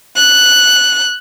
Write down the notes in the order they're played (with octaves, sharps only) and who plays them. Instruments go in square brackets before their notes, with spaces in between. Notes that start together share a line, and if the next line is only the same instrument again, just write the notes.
[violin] F#6